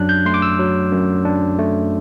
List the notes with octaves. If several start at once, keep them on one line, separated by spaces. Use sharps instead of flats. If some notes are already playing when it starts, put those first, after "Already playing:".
Already playing: F#2 F#3 D4 F#6
G6
A3 C6
D6
E6
F#3
F#2
D4
A3